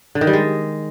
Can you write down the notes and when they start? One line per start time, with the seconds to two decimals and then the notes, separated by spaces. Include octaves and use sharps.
0.15 D3
0.21 D#3
0.27 G3
0.33 G#3